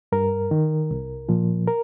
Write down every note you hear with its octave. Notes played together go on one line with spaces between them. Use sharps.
G2 A#4
D#3
C2
A#2 F3
A#4